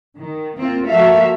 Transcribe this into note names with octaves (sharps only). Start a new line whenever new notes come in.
D#3
A#3 C4 F4
F3 A#3 F#4 A4 E5 F5